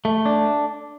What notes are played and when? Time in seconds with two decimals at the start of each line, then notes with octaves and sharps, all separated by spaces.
0.05 A3
0.26 D4